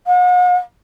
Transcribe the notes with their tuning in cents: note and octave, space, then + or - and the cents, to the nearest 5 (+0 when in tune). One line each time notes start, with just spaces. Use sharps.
F#5 -45